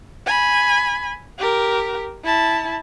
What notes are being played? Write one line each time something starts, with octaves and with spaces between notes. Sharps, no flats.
G#5 B5
G4 A#4
E4 A5